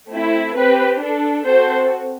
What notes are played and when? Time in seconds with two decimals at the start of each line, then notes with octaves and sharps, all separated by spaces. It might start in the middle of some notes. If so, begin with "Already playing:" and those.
0.09 A3 C4 E4
0.55 C4 G4 B4
1.00 D4 A4
1.45 C4 F#4 A4 C5